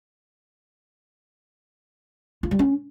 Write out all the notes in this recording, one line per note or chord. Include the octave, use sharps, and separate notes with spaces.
F4
G3
C#4